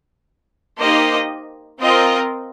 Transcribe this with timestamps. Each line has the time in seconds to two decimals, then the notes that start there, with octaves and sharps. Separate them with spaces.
0.79 A#3 D#4 G4 C5 D#5
1.80 C4 F4 A#4 D#5